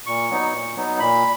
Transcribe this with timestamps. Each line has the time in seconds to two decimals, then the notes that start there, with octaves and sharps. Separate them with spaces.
0.06 A#2 C#6
0.30 F#3 B3 D#4
0.52 A#2
0.76 F#3 B3 D#4
0.99 A#2 B5